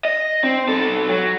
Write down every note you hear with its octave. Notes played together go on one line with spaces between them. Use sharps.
D#5
C4
B1 A4
F#3